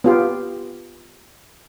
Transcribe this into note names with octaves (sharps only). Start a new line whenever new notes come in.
B3 F4 G4